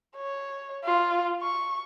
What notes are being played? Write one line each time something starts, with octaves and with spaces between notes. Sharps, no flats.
C#5
F4
C#6